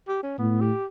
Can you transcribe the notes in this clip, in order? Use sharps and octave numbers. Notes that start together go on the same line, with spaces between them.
G4
C#4
A2 B3
G4